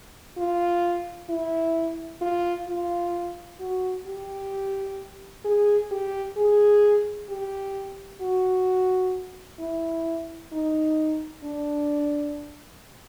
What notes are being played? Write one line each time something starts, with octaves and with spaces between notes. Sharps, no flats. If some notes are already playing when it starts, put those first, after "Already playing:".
F4
E4
F4
F4
F#4
G4
G#4
G4
G#4
G4
F#4
E4
D#4
D4